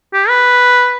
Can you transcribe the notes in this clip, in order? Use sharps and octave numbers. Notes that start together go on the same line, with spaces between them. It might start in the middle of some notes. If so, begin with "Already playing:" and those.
G4
B4